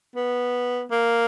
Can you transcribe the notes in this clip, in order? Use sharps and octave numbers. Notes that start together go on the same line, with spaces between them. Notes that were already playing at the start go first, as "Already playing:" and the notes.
B3
A#3